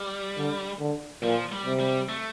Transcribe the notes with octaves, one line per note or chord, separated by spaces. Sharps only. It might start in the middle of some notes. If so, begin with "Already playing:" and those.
Already playing: G3
D3
D3
A#2 F3
G3
C3
G3
A3